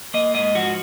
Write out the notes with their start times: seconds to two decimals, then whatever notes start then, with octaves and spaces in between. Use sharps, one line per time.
0.14 A#3 D#5
0.35 G#2 D#5
0.55 F3 F#4